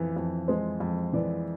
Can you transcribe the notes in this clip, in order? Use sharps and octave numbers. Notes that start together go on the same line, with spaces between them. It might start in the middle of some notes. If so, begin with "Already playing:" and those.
Already playing: F2 E3
F2
G#3 C5
F2
E3 D5